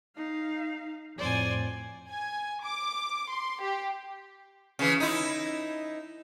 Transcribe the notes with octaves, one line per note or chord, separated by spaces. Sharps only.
D#4 F5
F2 A2 C5 D5 G#5
G#5
D6
C6
G4
C#3 E3
D#4 E4